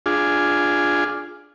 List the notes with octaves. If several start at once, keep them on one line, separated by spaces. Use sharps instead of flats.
D4 F4 G#4